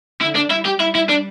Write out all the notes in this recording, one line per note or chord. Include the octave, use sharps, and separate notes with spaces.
D3 E4
D4
G3 E4
G4
G3 E4
E4
D4